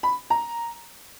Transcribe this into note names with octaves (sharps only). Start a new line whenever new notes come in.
B5
A#5